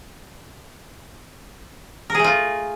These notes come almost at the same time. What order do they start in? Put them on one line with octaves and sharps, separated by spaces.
A#4 G#4 A3 F4